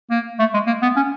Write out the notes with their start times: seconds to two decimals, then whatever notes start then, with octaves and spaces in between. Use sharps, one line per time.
0.11 A#3
0.39 A3
0.54 G#3
0.67 A#3
0.82 B3
0.97 C#4